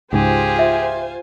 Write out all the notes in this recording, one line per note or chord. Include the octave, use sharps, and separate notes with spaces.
C#2 G#2 F4 G4 G#4 C5 G#5
E5